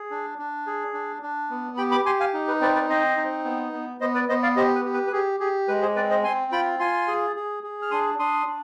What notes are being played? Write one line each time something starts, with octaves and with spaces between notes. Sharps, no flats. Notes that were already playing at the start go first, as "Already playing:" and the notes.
Already playing: G#4
D4
D4
G#4
D4
D4
B3
G4 G5 B5
B5 D6
G4 G#5 C6
F5 G#5
D#4
B4
C4 B4 D5
B4 D5
C4 C5 D#5
D#4
B3
B3
B3 C5 D#5
B4 D5
B3 C5 D#5
D5 F5
G4 C5 D#5
B4
G4
B4
B4
G4 G#4
G4 G#4
G#3 B4
G#4 C5
C4 B4 D5
C5 D#5
C4 G#5 C6
F4 G5 B5
F4 G#5 C6
G#4
G#4
G#4
F6
D4 C6 D#6
D4 C6 D#6
D4